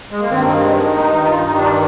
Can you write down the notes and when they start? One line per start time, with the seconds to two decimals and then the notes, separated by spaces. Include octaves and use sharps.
0.11 G#3
0.20 A#3
0.30 G2 D#3 C4
0.44 A#3
0.59 G#3
0.72 G#3
0.92 D#4
1.14 G2 D#3 D#4
1.25 F4
1.35 D#4
1.55 D4